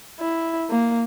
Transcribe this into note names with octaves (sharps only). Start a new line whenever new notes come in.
E4
A#3